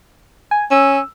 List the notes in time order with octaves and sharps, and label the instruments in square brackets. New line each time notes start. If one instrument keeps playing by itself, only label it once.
[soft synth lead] G#5
[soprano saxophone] C#4 [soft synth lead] E6